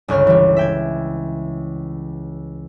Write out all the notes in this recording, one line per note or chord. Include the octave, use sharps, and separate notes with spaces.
G1 C#2 C#5 F6
E3 G3
E5 G5 G#6